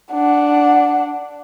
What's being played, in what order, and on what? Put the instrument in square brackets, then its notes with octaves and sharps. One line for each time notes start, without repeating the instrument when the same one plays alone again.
[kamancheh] D4 F#5